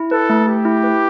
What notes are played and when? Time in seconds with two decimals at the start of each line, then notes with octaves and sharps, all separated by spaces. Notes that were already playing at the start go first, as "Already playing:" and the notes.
Already playing: E4
0.11 A4 B4
0.29 A3
0.47 A3 G4
0.65 E4
0.84 B4